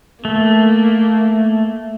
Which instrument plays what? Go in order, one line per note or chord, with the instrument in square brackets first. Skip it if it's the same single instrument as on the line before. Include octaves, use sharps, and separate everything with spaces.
[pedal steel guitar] A3 [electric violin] A#3